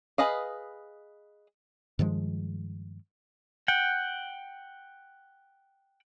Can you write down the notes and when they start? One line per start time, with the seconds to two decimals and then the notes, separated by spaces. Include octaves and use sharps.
0.18 G#4 B4 D#5 F5
1.99 G2 D#3 F3 G#3
3.68 F#5 G5